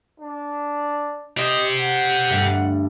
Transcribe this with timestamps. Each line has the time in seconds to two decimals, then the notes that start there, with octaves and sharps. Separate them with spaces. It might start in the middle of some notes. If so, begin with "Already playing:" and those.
0.20 D4
1.38 G4 C5 D#5
1.80 F#5
2.31 D2 G2 A3